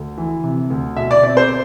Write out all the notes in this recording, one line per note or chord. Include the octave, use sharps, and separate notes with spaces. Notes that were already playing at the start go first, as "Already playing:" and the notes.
Already playing: D2
E3
C3
D2
B2 E5
D5
C4 D5
C5